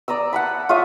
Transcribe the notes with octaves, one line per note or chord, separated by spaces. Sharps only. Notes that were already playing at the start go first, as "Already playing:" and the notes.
D5 A#5 D#6 E6
F#5 A5 B5
F4 C#5 E5 D#6